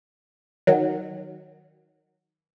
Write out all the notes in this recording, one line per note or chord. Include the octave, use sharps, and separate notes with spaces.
D#3 F#3